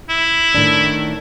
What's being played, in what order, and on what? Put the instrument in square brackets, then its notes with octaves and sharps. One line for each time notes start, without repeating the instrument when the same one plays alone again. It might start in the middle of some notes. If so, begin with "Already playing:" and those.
[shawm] E4
[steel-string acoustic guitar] A2 D#3 D4